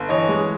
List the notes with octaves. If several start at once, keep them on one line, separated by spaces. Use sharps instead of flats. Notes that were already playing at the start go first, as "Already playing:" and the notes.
Already playing: G1
E3 C#5 D#5
G#3